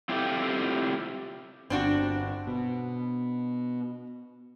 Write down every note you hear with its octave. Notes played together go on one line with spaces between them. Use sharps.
C4 E4 F4 G4 A4
G1 C4 D4 F#4
B2